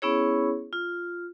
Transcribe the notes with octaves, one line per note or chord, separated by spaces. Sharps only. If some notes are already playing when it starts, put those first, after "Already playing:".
B3 C#4 E4 G#4 C#5
F4